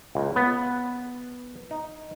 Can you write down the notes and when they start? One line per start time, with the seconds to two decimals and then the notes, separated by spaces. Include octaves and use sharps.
0.15 C#2
0.36 B3
1.71 D#4